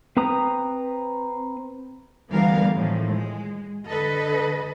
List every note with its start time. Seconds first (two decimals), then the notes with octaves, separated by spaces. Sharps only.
0.17 C4 B4 A#5 D#6
2.30 D2 E3 G3 B3 A#4 F5
2.75 A2 D#3 F3 G#3
3.09 G#3
3.88 D3 A4 B4 D#5